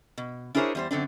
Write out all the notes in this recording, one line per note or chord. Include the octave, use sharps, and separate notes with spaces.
B2
D4 E4 G#4 A#4 C5 C#5
E2 G3 C5
F#2 D3 C4 D4